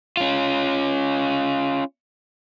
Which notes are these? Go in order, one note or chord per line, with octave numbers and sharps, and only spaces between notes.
C#4 F4